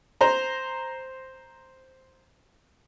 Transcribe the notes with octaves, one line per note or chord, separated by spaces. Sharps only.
C5 A#5